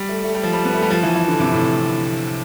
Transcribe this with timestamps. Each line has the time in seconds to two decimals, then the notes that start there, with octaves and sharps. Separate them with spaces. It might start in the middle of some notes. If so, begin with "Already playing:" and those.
Already playing: G3
0.09 A3
0.24 A3
0.35 G3
0.43 F3
0.53 G3
0.65 B3
0.74 A3
0.82 G3
0.90 F3
1.03 E3
1.15 E3
1.28 D3
1.39 C3
1.52 A2